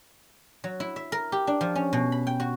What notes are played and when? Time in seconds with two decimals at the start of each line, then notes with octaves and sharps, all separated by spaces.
0.64 F#3
0.80 E4
0.96 E5
1.12 A#4
1.32 G4
1.47 D4
1.61 F3
1.75 C#4
1.93 B2
2.12 B5
2.27 G5
2.40 F#4